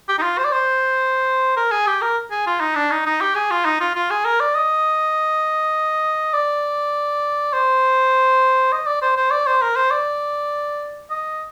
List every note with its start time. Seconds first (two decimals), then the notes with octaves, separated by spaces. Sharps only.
0.08 G4
0.18 D#4
0.22 F4
0.38 C5
0.44 D5
0.52 C5
1.57 A#4
1.71 G#4
1.87 G4
2.01 A#4
2.31 G#4
2.47 F4
2.61 D#4
2.75 D4
2.91 D#4
3.06 D#4
3.21 G4
3.35 G#4
3.51 F4
3.65 D#4
3.80 F4
3.95 F4
4.10 G#4
4.25 A#4
4.40 D5
4.55 D#5
6.33 D5
7.53 C5
8.72 D#5
8.86 D5
9.02 C5
9.17 C5
9.31 D5
9.47 C5
9.62 A#4
9.76 C5
9.91 D5
11.10 D#5